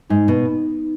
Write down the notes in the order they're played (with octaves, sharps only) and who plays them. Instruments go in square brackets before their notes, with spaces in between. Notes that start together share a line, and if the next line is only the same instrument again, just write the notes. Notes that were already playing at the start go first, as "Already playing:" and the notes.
[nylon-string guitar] G#2 [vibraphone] D#4
[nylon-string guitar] B2